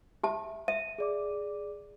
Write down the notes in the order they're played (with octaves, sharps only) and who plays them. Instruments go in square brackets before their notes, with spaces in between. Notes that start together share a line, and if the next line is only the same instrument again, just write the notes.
[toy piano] G4 A5 [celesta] E5
[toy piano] E5 [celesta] D#7
[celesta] G#4 D5 D6